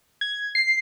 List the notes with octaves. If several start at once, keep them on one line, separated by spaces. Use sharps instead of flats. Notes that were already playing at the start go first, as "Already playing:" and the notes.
G#6
C7